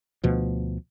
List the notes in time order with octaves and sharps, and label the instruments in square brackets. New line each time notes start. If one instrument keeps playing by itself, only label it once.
[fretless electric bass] D2 B2 F3